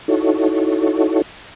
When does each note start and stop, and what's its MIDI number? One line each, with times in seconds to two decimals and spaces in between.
0.08 1.22 63
0.08 1.22 64
0.08 1.22 66
0.08 1.22 69
0.08 1.22 73